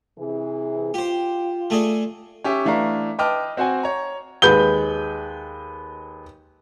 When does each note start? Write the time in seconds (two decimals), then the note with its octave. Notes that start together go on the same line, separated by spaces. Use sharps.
0.18 C3 E3 G#4
0.94 F4 G4 C5
1.70 A3 G#4 D5
2.44 C#4 G4 E5
2.65 E3 A3 D4 F5 A#5
3.19 B4 D#5 G5 A5 D6 F6
3.57 C4 F#4 C5 F#5 G#5
3.83 C#5 A#5
4.42 D#2 G#3 B4 G6 G7